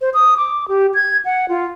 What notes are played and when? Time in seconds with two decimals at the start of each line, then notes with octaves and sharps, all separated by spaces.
0.01 C5
0.14 D#6
0.37 D6
0.68 G4
0.94 G#6
1.25 F#5
1.49 F4